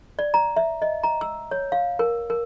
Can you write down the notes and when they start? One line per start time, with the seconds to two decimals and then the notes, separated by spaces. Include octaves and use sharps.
0.19 D5
0.34 A#5
0.57 E5
0.82 D#5
1.03 A#5
1.21 E6
1.51 C#5
1.72 F5
1.99 A#4
2.30 A#4